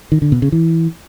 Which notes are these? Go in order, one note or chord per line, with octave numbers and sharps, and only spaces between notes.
D#3
D3
B2
C#3
E3